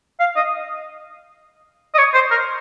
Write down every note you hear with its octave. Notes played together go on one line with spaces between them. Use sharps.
F5
D#5
D#5
C#5
C5
A#4